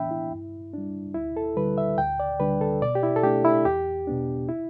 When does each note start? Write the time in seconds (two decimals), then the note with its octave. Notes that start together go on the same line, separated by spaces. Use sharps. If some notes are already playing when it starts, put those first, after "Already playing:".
Already playing: A2 E3 B3 D4 E5 G5 B5
0.11 E4
0.31 G2
0.73 G3 D4
1.14 D2 E4
1.37 A4
1.57 D3 G3 B4
1.78 E5
1.98 D2 G5
2.20 D5
2.40 D3 G3 D4 B4
2.61 A4
2.82 B2 D5
2.95 G4
3.03 E4
3.16 A4
3.23 A3 D4 G4
3.45 E4
3.65 E2 G4
4.07 B2 B3 D4
4.49 E4